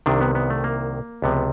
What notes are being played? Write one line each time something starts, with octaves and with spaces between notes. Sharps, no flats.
C2 C3 D#3 D4
B3
B3
A3
A#3
C#2 C3 F3 B3